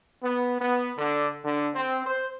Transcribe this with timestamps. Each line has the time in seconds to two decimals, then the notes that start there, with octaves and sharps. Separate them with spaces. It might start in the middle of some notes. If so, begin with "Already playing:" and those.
0.24 B3
0.61 B3
0.98 D3
1.45 D3
1.75 C4
2.06 C5